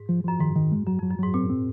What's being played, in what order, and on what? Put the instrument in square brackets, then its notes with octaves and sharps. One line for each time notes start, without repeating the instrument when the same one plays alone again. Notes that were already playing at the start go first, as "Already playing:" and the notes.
Already playing: [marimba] G#2
[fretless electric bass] F3
[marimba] F#2 [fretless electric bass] F3
[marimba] G#2 [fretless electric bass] D#3
[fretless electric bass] D#3
G#3
[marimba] F#2 [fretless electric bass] F#3
[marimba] F2
[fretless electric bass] F#3
[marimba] F#2
[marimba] G#2 [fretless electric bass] F#3
[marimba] A#2 [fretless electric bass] C4
[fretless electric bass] C4